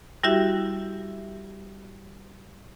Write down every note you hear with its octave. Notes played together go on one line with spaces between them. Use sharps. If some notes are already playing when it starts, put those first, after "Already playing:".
G3 E4 F#4 G4 E5